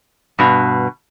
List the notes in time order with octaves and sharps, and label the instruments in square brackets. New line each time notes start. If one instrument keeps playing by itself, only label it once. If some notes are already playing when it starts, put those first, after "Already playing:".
[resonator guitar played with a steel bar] G2 B2